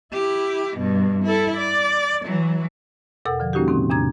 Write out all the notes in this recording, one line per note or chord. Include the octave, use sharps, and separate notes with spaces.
E4 G4
G2 B2
E4 A4
D5
E3 F#3
E2 B2 A4 A#4 F#5 E6
D3 F3
G3 A#3 C#4 D#4 F#4 G4
A2 C3 D#3 C4
E2 C3 D4 A#5 G#6